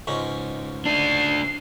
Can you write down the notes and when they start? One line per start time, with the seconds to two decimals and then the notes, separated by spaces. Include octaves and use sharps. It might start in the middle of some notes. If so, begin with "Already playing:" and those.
0.07 C#2 G#2 C#4
0.86 A3 D4 C7